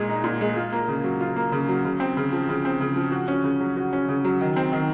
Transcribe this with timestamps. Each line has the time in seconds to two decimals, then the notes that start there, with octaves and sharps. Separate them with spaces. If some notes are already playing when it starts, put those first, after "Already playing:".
Already playing: A#2 G#3 G#4
0.09 D#4
0.24 A#2
0.41 G#3
0.57 F4
0.72 A#3
0.88 C#3
1.04 F#3
1.21 F4
1.36 A#3
1.52 C#3
1.68 F#3
1.85 C#3
2.00 C4
2.17 C#3
2.32 F3
2.49 C#3
2.65 C4
2.81 C#3
2.96 F3
3.12 F#4
3.28 C#4
3.44 C#3
3.60 F#3
3.77 F#4
3.93 C#4
4.09 C#3
4.24 F#3
4.41 D#3
4.57 C4
4.72 D#3